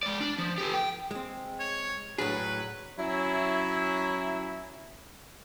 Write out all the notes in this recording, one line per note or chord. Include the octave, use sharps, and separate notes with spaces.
G#3 D5
D4
F3
G4 A4
G5
G#3 C4
C#5
A2 F#3 D4 G#4 B4
F#3 C#4 E4